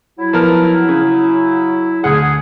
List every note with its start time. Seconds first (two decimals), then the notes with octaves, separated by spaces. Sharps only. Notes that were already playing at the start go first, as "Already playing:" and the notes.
0.19 F#3 E4
0.33 F3 B3 A#4
0.89 C#3
2.04 D2 G#4 F#5